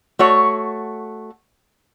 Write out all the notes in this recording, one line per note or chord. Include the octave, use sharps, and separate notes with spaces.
A3 F#4 C#5